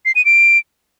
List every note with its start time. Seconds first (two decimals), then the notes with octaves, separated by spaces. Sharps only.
0.05 C7
0.15 D#7
0.25 D7